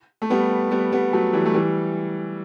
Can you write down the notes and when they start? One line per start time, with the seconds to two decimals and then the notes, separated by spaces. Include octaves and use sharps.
0.22 A3
0.30 G3 B3
0.71 G3 B3
0.92 G3 B3
1.13 F#3 A3
1.33 E3 G3
1.45 A3
1.54 E3 G3